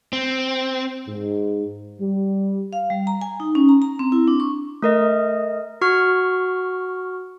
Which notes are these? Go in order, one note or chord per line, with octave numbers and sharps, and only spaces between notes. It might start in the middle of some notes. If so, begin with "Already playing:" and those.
C4
G#2
G3
F5
G3
A#5
G#5
D#4
C#4
A#5
A#5
C4
E4
D4
C#6
A3 A#4 D#5
F#4 C#6 F6